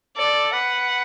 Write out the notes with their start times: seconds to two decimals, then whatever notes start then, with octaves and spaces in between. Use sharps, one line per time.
0.17 A4 D5
0.53 B4 F#5